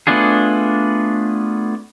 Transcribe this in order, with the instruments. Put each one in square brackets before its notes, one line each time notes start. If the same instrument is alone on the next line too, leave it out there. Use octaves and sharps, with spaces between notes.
[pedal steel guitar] A3 B3 D4 F4 G#4